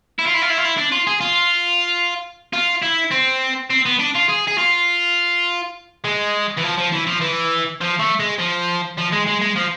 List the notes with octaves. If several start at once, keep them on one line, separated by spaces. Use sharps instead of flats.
E4
F4
E4
F4
E4
F4
E4
D4
F4
G#4
F4
F4
E4
C4
C4
B3
D4
F4
G#4
G#4
F4
G#3
E3
F3
F3
E3
F3
E3
F3
A3
G#3
F3
F3
G#3
G#3
G#3
F3